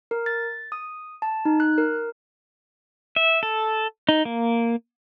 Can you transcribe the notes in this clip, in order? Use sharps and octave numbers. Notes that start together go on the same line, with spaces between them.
A#4
A6
D#6
A5
D#4
F#6
A#4
E5
A4
D#4
A#3